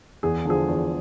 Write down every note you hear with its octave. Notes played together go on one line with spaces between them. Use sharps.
E2 G#4
D3 F3 G#4
E2